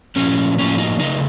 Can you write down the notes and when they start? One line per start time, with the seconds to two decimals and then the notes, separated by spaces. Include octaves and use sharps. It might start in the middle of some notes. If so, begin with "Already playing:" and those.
0.16 A#2 F3 A3 C#4
0.58 A2 F3 A#3 C#4
0.78 D#4
0.99 C#3 A3 D#4